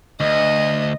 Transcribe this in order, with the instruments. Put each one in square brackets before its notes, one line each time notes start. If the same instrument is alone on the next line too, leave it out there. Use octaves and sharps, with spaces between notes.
[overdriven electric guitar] D2 [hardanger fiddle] D#5